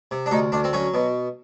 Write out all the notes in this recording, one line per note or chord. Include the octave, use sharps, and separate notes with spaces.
C3
D4
D2 D#4
D2 D4
C4
F#3 C#4
B2